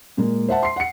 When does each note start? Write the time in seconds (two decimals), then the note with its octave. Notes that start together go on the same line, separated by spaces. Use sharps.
0.17 A#2 G#3 A#3
0.48 C5 E5 F#5 A5
0.63 C6 C7
0.76 F#5 C#7